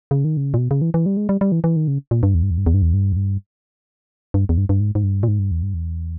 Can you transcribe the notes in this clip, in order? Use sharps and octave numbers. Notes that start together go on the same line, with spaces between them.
C#3
D#3
C#3
A#2
B2
C#3
E3
E3
G3
G#3
G3
G3
E3
E3
D#3
C#3
A#2
G2
E2
G2
E2
G2
E2
G2
E2
G2
E2
G2
G2
E2
G2
G2
G#2
G#2
G2
A#2
G#2
G2
E2
G2
E2